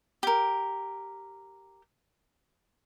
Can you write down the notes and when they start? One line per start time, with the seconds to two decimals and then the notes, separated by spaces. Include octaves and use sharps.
0.23 G4 A#4